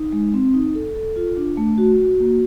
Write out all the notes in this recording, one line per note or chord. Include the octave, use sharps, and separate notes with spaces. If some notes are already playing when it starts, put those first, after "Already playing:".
Already playing: D#4
G#3
C4
D#4
A4
A4
F4
D4
A3
F#4
F#4
A#3